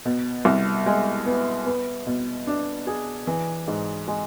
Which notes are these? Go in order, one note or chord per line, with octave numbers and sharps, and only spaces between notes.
B2
C2
G#3
B3
B3
B2
D4
G#4
E3
G#2
G#3